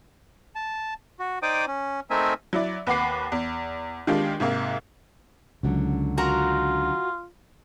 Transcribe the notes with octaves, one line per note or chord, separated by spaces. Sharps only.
A5
F#4
D#4 C5 D5 G5 D6 D#6
C#4
A3 C4 D#4 A#4 E5 G#5
F#3 E4 D5
D#2 B4 F#5 B5 D6 C7
E2
D#3 G#3 D4 F4 G4
G#2 C3 A#3
C#2 D3 F#3 C#4
F4 F#4 A#4 A#5